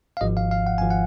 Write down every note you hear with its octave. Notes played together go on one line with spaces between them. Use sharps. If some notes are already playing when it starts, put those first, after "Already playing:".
F5
G#1 G#2 F3 D#5
F5
F5
F#5
G#1 F3 G#5
F#5